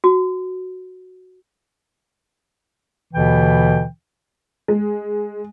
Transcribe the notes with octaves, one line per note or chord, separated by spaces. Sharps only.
F#4
D#2 B2 D3 E3 G5
G#3